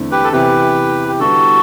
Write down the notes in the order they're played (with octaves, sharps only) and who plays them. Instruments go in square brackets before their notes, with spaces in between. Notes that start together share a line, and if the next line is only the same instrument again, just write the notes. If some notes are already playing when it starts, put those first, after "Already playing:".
Already playing: [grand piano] E2 D3 A3 C4 E4
[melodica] G4 B4
A4
[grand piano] C3 E3 B3 [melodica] G4 B4
[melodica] G4
[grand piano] D3 G3 B3 E4 [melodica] F#4 A4